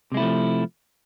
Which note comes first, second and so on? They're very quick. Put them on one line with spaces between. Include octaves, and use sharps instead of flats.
C3 G#3 E4 A3 F3